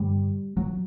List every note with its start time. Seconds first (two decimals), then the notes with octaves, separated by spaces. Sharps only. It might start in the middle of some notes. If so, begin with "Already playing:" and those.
Already playing: G2 D3 G3
0.57 F#3